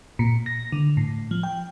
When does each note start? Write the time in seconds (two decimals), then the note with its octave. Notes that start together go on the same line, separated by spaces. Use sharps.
0.19 A#2
0.46 A#6
0.72 D3
0.97 A2
1.31 F3
1.43 G5